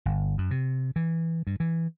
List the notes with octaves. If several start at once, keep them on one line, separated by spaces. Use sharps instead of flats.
G1
F#2
C3
E3
G2
E3